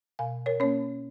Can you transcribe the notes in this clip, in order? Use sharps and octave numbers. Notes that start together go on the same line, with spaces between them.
B2 F5 G#5
A#4 C#5
A#3 C#4 C#5